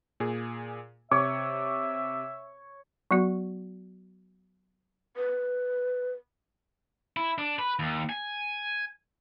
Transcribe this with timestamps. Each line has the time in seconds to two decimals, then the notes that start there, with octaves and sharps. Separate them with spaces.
0.20 A#2 G#4
1.11 C3 C#5 E5 D6
3.11 F#3 B3 F#4
5.17 B4
7.17 E4
7.38 D4
7.59 B4
7.79 D#2
8.09 G#5